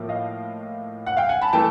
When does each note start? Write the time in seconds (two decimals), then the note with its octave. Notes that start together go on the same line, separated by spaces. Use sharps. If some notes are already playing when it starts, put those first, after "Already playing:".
Already playing: A2 F3 A#3
0.09 D#5 F5
1.06 F#5
1.17 F5 G5
1.29 F#5 G#5
1.42 A5 B5
1.53 E3 A3 G5 A5